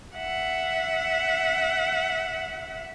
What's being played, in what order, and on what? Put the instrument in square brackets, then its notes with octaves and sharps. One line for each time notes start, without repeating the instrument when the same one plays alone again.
[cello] E5 F#5